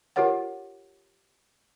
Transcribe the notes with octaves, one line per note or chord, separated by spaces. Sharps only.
F4 G4 A#4 C#5 F#5